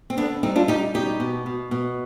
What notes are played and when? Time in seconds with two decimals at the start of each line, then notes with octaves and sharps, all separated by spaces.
0.10 C4
0.17 D3 B3 D4
0.43 G3 C4 D#4
0.56 D4 F4
0.68 G3 D#4 G4
0.94 B2 D#4 G4
1.20 B2
1.46 B2
1.71 B2